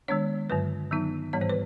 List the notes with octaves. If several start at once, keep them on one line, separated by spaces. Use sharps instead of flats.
D#3 G#3 B3 D4 C#5
G2 D3 F#3 B4
D#3 F#3 B3 D#4
G#2 E3 G3 B3 C#5
C5
B4